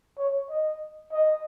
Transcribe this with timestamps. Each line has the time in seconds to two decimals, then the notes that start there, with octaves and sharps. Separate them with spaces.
0.18 C#5
0.50 D#5
1.13 D#5